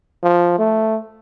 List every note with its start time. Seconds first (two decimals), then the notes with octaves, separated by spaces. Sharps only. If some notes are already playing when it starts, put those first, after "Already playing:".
0.23 F3
0.59 A3